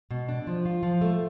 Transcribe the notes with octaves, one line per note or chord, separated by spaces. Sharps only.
B2
D4
F3
F4
F3
A3